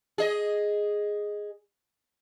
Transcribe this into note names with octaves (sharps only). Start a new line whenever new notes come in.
G#4 D#5